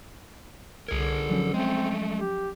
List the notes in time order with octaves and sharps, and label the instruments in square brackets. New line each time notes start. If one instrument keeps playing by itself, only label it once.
[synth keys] C2 G#6 [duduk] D3 [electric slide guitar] G#4 A#4
[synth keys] F3 F#3 C#4
[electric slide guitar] G#3 A3 [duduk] C4
[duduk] G4